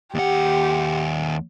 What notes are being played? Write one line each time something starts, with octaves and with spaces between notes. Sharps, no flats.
D#2 G4 F#5